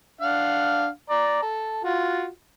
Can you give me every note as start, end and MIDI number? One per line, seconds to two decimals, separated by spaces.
0.21 0.88 62
0.21 0.88 77
0.21 0.88 78
1.10 1.42 74
1.10 1.42 82
1.42 1.82 69
1.84 2.27 65
1.84 2.27 66